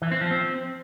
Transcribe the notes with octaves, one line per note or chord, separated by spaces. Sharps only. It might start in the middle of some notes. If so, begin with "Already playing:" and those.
E3
C4
F3
C4